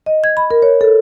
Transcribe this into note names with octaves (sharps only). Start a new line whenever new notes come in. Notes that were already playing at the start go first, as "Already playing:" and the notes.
D#5
G#6
B5
A#4
C#5
A4